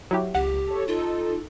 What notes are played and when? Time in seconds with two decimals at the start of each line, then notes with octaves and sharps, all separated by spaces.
0.11 F#3 E4 G4
0.35 C#2 G4 F#5
0.67 A4 C#5
0.88 D#4 F4 A4